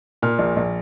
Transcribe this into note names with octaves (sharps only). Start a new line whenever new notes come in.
A#2 F6
A#1
A#1